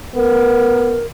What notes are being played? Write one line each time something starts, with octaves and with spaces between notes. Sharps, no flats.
B3 A#4